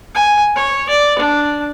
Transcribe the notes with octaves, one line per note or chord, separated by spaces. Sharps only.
G#5
C#5
D5
D4